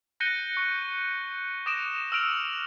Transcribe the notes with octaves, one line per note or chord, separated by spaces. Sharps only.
F#6 G6 A#6 C#7 D#7 G7
C#6
D6 D#6 A#6 D7 E7
E6 F6 D7 F7